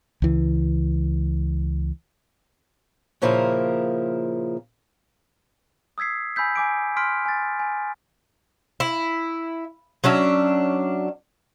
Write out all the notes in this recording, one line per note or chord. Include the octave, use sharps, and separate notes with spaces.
C#2 E3
A#2 C#3 F3 A#3 E4 A#4
D#6 E6 G#6 B6 C7
G#5 B5 E6 G6 B6
G#5 D6 D7
C6 F6 B6 D7
G#5 A6
G#5
E4
F#3 C#4 D4 E5